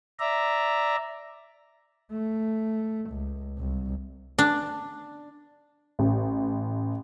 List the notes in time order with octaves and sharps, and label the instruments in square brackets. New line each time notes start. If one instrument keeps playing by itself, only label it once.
[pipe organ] D5 E5 A#5
[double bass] A3
C#2
C2
[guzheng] D4
[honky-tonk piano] A1